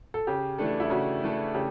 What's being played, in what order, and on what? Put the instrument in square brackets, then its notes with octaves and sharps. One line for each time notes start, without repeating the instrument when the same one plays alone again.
[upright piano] A4
[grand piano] C#3 [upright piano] G4
[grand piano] E3 A3 D4 A4
[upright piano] E4
[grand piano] C#3 [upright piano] F#4
[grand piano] E3 A3 D4 A4
[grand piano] C#3 [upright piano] G4